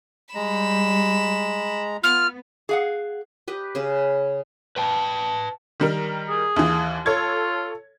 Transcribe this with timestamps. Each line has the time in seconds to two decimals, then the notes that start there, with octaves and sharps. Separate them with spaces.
0.35 G3 G#3 A#5 B5 E7
2.03 B3 F4 F6
2.69 G#4 F5 F#5
3.48 G4 B4 D#5
3.75 C#3 G#4 B4
4.76 B4 G5 A5
5.80 D#3 G3 A#4
6.29 G#4
6.56 D#2 E3
7.06 F4 A4 C#5 G#6